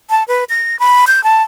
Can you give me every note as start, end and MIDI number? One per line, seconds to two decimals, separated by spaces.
0.10 0.23 81
0.28 0.44 71
0.49 0.79 94
0.79 1.05 83
1.07 1.23 91
1.24 1.42 81